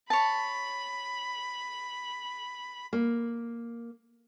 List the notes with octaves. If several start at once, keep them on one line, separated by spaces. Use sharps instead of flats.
C#5 A5 B5
A#3